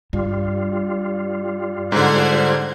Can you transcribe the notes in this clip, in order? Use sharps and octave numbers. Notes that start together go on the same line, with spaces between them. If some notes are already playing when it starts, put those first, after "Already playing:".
G2 G3 F4
G#2 D3 C5 F#5 G#6